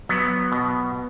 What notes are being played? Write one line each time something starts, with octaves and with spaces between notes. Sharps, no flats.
F#3 B3
B2